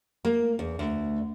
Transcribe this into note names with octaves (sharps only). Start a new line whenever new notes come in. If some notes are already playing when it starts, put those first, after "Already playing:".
A#3
E2
D2